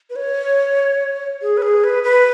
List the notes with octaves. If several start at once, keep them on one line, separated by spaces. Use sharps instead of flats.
B4
C#5
G#4
B4
G#4
B4
B4